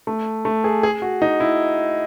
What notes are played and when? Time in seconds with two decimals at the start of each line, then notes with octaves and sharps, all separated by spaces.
0.07 A3
0.45 A3
0.64 G#4
0.83 G#4
1.02 F#4
1.22 D#4
1.40 E4